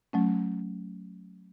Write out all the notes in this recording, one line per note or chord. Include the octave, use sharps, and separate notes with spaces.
F#3 A3 C#4